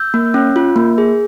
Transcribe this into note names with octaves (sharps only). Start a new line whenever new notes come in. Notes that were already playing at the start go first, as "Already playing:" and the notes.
Already playing: E6 G6
A#3
C#4
F4
A#3
G#4